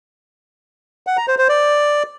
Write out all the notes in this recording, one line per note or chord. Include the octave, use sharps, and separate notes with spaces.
F#5
A#5
C5
C5
D5